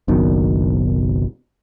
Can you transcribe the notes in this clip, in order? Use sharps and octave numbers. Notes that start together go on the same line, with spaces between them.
F#1 B1 B2 D#3